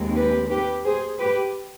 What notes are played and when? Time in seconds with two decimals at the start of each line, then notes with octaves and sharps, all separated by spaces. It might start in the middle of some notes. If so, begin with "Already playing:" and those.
Already playing: D#2 D#3 G#3 C4
0.15 G4 B4
0.49 G4 B4
0.84 G#4 C5
1.19 G4 B4